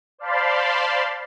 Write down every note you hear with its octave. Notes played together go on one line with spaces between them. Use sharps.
C5 D5 F5 A5 B5 C6